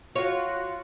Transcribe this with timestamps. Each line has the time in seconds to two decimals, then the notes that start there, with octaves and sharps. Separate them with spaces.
0.16 F4 F#4 C#5